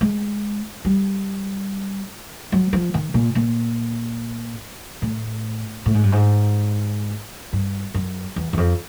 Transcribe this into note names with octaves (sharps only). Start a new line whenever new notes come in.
G#3
G3
F#3
F3
D#3
A#2
A#2
A2
A2
G#2
G2
G#2
G2
F#2
E2
E2
F2